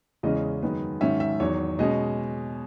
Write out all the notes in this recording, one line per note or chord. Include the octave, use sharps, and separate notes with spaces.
E2 C#3 E3 G#3 C#4 D#5
F#2 D#3 G#3 B3
G#2 D#3 F#3 C#4 E5
E5
E2 D#3 F#3 C#5
B2 G#3 C#4 D#5